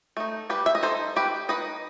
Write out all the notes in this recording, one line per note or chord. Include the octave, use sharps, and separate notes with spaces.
A3 D#4
G3 G4 B4
E5
D#5
D#4 A4 C5
G3 G4 B4
D#4 B4 D#5